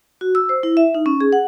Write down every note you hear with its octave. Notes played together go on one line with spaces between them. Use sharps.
F#4
E6
C5
E4
E5
D#4
C#4
G#4
F#5